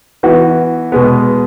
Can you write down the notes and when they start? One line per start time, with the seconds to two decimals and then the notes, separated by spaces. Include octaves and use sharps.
0.23 E3 B3 F#4
0.92 B2 G#3 B3